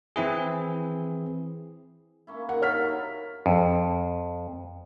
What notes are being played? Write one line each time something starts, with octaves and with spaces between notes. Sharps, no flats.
E3 C4 E4 G#4
A#3 C#4 E4
G2 D#3 F#5
F4 A4 C#5 F6 B6
F#3 D#4 E4
F2